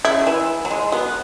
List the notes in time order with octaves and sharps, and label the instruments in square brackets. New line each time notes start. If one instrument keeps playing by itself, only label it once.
[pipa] C#3 [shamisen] E4
[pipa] F#3
E3
F#3
G#3
[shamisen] F#3 [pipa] B3